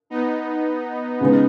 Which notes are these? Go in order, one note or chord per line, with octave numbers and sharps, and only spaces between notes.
B3 D#4
C#3 G#3 B3